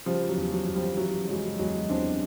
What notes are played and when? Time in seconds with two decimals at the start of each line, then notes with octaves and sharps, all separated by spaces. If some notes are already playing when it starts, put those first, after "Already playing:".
0.06 C#3 F3 G3
0.28 F#3
0.36 E2
0.52 F#3
0.67 E2
0.74 F3 G3
0.97 E3 F#3
1.28 C#3 F#3 G#3
1.59 E2 F#3 G#3
1.89 E2 C4 D4